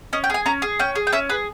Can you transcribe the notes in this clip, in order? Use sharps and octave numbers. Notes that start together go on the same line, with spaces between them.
C#4 D#5
G5
G#4 G#5
C#4 A#5
G#4
C#4 G5
G#4
G5
C#4 E5
G#4 B4